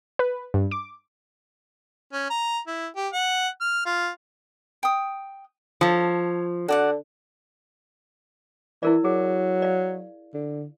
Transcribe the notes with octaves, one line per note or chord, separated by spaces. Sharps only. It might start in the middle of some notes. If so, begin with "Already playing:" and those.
B4
G2
D6
C#4
A#5
E4
G4
F#5
F6
F4
G5 D#6
F3 A4 C#5
D3 F#4 D5 F#5
E3 E4 A#4 D5
F#3 G#4
D5 F5
D3